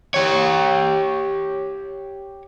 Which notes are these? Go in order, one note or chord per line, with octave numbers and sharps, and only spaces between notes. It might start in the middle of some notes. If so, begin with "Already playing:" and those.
G4 C#5